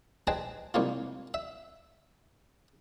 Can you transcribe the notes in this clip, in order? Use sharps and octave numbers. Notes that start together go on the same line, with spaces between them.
G#4 B4 C5 D#5 G5 A5
C2 G#2 A#3 F4
E5